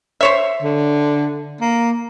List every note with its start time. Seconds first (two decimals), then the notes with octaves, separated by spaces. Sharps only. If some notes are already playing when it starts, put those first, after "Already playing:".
0.21 C5 C#5 E5
0.62 D3
1.61 A#3